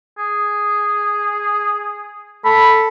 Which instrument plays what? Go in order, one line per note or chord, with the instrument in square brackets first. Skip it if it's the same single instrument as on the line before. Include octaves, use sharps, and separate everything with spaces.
[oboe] G#4
[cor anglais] A4 [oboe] B5